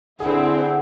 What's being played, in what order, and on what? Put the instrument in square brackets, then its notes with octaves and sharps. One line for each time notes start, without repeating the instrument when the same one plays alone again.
[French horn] D3 [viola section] C4 E4 [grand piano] G#4 [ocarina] F#5